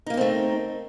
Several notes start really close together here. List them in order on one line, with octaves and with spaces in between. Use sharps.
D#4 A#3 A#4 C4 A3